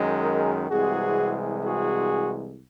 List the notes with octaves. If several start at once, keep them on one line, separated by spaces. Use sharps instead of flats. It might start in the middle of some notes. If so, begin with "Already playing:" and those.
Already playing: F#2 D#3 G#3
G#4 A#4
C2 C3 E3 G#3 F#4 G#4
F#4 G#4